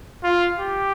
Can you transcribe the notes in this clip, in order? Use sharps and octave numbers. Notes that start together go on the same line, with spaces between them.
F4
G4